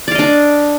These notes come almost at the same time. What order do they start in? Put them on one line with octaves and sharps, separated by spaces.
D5 F5 D#5 D4